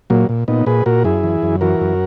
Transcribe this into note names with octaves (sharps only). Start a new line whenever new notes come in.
A#2 F#3 A#3
A#2
A#2 B3 D#4
A#2 G#4 B4
A#2 F#4 A#4
F#2 E4 G#4
E3
F#2
E3 F#4 A#4
F#2